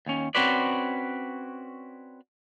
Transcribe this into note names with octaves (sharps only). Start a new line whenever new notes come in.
D#2 C#4
C4 C#4 F#4 B4 D5